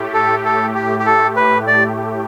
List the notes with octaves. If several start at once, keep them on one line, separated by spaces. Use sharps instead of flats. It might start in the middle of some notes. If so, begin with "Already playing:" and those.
Already playing: A2 A3 G4
A4
A4
G4
G4
A4
B4
D5